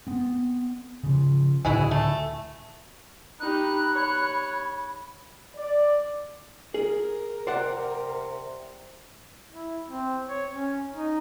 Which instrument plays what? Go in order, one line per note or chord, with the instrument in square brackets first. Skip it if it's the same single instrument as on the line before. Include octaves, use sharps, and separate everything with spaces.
[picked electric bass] B3 C4
C#3 F3
[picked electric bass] C#2 A2 D3 [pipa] F#3 E4 G#4
[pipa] A3
[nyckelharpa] D#4 G4 [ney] B5 [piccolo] F#6
[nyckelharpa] C#5
[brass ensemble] D5
[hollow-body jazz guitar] G#4 [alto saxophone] A#4
[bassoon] C3 [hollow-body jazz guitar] C5 D5 F#5
[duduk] E4
C4
C#5
C#4
D#4